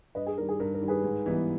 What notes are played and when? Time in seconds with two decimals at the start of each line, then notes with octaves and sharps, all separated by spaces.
0.15 G2 B4 D#5
0.27 G#4
0.37 D#3 G3 A#4
0.49 G#4
0.60 G2 A#4
0.74 A#4
0.81 D#3 G3
0.88 G#4 B4
1.04 G#2
1.26 E3 G3 B3 D#4